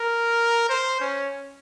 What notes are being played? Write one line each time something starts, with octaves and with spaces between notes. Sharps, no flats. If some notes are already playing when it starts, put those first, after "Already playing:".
Already playing: A#4
C5
C#4